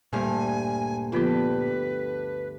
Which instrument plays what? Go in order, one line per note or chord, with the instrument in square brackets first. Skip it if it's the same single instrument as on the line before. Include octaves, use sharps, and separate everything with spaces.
[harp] D2 G2 F6 [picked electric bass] A#2 A#3 [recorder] G#5
[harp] D3 G4 [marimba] F3 B3 F4 [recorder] B4